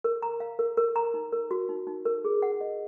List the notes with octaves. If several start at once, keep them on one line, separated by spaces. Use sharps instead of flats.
A#4
A#5
F5
A#4
A#4
A#5
D#4
A#4
F#4
D#4
D#4
A#4
G#4
F#5
D#5